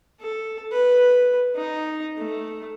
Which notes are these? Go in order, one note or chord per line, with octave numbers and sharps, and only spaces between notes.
A4
B4
D#4
A3